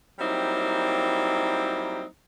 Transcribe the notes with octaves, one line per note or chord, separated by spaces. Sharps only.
F#3 G3 A#3 C4 D#4 E4